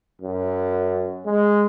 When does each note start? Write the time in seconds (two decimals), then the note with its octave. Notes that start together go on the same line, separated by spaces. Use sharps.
0.21 F#2
1.26 G#3